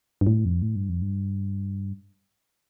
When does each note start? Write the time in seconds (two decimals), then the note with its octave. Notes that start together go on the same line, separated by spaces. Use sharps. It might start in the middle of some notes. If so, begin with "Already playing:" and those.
0.21 G2
0.27 A2
0.45 F2
0.62 A2
0.76 G2
0.89 F2
1.02 G2